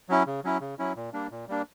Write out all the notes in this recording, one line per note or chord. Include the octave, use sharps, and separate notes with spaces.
F#3 C#4 E4
C#3
F#3 C#4 E4
C#3
F#3 C#4 E4
A#2
G3 A#3 D4
A#2
G3 A#3 D4